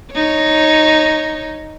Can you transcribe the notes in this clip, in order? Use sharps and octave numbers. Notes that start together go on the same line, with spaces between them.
D#4 C#5